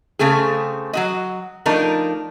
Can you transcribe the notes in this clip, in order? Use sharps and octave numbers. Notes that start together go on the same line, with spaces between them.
C#3 A3 C4 G#4
F#3 F#4 D#5
F3 A3 D4 D#4 A#4